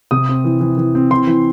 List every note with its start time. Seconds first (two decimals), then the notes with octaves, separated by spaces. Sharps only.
0.11 C3 D#6
0.29 C4
0.44 E3
0.61 E3
0.77 E3
0.95 C4
1.11 E3 C6
1.27 E3